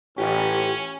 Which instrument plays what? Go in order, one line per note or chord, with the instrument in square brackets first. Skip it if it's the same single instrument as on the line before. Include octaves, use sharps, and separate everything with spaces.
[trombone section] A1 [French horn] C#4 [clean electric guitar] F4 G4